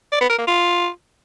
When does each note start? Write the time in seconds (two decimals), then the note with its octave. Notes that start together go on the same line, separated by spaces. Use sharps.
0.12 D5
0.21 B3
0.30 A#4
0.39 A#3
0.47 F4